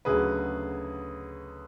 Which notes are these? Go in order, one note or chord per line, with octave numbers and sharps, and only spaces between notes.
D2 C#3 F#3 G#4 B4